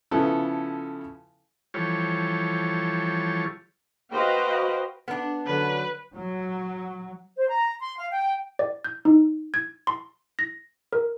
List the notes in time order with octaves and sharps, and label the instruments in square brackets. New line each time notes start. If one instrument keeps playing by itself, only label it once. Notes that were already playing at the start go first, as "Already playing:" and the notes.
[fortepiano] C#3 F3 B3 E4 A4
[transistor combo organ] E3 F3 G3 A4 C#5
[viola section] F#4 B4 C5 D#5 F5 G5
[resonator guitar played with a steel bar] B3 D4
[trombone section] D3 F#3 [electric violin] B4
[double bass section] F#3
[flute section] C5
A#5
C6
F5
G5
[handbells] D5
G6
D#4
G#6
C6
A#6
A#4